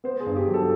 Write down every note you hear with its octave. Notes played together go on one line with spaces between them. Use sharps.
B3 C5
G#4
G2
G4
F#3
A4